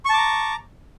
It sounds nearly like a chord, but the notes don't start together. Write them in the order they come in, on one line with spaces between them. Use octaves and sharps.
C#6 A5 D6 A#5